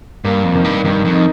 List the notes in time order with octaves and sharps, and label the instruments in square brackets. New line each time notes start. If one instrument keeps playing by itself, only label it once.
[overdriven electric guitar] G2 [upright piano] A#3
[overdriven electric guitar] F2
[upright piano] D#3
[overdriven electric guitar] G2
[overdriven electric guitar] G2 [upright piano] D#3
[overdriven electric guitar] F2
[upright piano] D#4